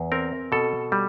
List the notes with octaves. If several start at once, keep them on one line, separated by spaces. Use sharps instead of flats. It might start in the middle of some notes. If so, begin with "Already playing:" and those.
Already playing: E2
C4 A#4
B2 A4
G3